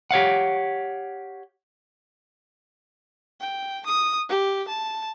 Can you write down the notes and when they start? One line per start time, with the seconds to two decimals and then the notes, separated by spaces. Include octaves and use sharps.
0.11 G4 C#5 F5 F#5
3.40 G5
3.86 D#6
4.29 G4
4.68 A5